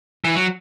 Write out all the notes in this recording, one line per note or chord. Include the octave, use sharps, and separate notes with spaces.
E3
F#3